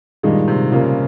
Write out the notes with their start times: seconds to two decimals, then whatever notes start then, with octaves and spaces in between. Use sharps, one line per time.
0.23 G2 A#2 D#3 G#3
0.48 C3
0.72 C#3 G3 A#3 C#4 F4